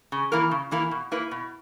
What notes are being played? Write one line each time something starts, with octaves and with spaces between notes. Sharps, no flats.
C#3
E3 A#3 E4 A#4
C#3
E3 A#3 E4 A#4
B2
A#3 E4 B4
B2